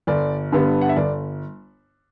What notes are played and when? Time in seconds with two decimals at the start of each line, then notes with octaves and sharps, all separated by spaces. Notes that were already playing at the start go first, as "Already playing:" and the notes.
0.07 G1 D5
0.52 G2 D3 G3 B3
0.81 F#5
0.89 E5
0.96 G1 D5